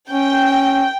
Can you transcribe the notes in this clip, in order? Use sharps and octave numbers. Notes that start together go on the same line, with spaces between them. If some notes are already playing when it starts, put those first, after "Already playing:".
C#4 G5